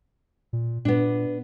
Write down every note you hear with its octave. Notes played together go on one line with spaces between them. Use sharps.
A#2
A#2 B3 D4